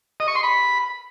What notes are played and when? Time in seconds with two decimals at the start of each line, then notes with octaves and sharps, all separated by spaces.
0.20 D#5
0.28 C#6
0.35 C6
0.43 B5